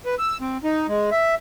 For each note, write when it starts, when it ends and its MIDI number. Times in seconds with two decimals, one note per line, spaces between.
0.05 0.15 71
0.19 0.38 88
0.41 0.57 60
0.64 0.87 63
0.88 1.10 56
1.11 1.35 76